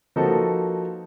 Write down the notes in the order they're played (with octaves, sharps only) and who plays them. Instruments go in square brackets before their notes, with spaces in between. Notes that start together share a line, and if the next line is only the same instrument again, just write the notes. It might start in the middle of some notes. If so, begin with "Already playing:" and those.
[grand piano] F3 A#3 D#4 F#4 A4 B4